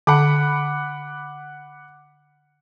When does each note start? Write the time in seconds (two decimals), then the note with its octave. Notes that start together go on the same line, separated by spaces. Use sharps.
0.07 D3 F#5 B5 D6